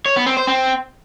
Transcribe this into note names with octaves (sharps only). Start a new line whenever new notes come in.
C#5
B3
C4
C5
C4